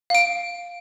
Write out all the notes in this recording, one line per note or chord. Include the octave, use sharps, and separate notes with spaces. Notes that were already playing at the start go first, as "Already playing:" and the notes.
F5 D7